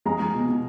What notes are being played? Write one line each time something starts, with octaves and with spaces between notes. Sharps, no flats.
G#3 A#5
G#3
B2
B2